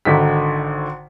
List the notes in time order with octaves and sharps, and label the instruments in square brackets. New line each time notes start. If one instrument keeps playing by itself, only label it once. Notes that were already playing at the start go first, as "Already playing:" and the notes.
[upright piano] G#1 D3 D#3 B6